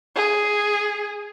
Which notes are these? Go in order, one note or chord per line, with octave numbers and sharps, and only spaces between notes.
G#4